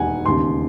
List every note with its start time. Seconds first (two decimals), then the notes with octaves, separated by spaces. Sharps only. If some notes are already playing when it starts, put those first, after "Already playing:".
Already playing: E1 D#2 D#3 F#5 G#5
0.26 E1 D#2 C#3 C6